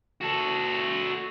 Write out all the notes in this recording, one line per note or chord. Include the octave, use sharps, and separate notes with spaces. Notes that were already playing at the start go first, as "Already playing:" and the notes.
F#4 A4